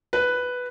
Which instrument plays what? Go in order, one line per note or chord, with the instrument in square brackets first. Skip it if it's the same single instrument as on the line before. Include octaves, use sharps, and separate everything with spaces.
[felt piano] B4